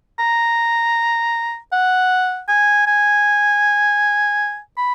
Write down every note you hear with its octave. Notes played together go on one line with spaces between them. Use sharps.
A#5
F#5
G#5
G#5
B5